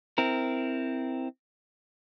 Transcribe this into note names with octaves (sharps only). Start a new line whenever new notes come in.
C4 E4 A#4